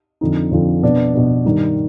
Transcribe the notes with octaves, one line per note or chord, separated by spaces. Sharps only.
F2 D3 F3 C4 D#4
F2 D3 F3 C4 D#4
B2 B3 D4
B2 B3 D4
G2 D#3 G3